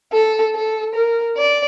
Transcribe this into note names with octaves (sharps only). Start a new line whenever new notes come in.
A4
A4
A#4
D5